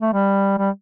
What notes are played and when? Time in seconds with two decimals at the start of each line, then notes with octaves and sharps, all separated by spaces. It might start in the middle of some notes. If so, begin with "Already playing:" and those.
0.02 A3
0.13 G3
0.58 G3